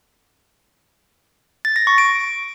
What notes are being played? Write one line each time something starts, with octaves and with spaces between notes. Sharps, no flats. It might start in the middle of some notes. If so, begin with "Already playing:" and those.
A6
A#6
C#6
D7